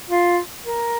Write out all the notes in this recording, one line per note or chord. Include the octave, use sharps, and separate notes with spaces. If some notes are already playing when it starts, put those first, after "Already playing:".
F4
A#4